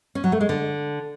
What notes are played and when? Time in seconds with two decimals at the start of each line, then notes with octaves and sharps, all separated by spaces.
0.15 C#4
0.24 F#3
0.32 A3
0.41 G#3
0.49 D3